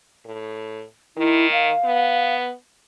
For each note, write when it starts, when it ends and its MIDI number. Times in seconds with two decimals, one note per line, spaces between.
0.25 0.83 45
1.17 1.71 51
1.17 1.50 64
1.52 2.35 77
1.84 2.51 59